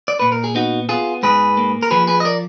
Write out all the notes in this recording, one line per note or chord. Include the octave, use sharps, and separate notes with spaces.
D5
A#2 B4
A#4
G#4
B3 D#4 F#4
B3 F4 G#4
G#2 G#4 B4
A#3
A#4
F3 G#4 B4
G#4 B4
D#5
A#4 D5